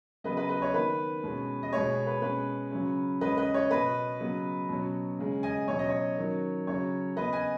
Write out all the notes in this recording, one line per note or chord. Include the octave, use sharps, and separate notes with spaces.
C#3 F#3 B3 B4 D#5
B4 D#5
B4 D#5
C#5
D#3 B3 B4
B2 G#3 C#4
D#5
B2 G#3 B3 C#5
B4
B2 G#3 C#4 B4
C#3 F#3 C#4
C#3 G#3 C#4 B4 D#5
B4 D#5
C#5
B2 B3 B4 D#5
C#3 F#3 B3
B2 F#3 C#4
C#3 G#3 C#4
D#5 G#5
B2 F#3 C#4 C#5
D#5
C#5
D#3 F#3 C#4
C#3 F#3 C#4 C#5
C#3 B3 B4 D#5
D#5 G#5